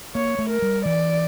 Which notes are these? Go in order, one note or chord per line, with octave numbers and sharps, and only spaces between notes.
A#3 C#5
A3
A#4
G3
E3 D5